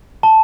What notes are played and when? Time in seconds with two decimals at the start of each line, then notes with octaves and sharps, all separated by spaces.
0.23 A5